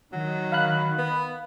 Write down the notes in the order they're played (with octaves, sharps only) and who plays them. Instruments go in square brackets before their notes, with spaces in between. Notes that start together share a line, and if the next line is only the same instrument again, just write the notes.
[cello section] D#3 [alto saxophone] F#3
[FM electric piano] F5 B5 F#6
[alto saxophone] B3